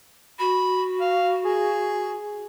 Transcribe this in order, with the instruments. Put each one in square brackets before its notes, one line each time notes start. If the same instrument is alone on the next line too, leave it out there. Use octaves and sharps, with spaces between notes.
[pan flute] F#4 [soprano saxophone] B5
[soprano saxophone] F5
G#4